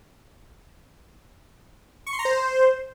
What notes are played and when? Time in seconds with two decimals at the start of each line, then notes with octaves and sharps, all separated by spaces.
2.06 C#6
2.13 C6
2.19 A#5
2.25 C5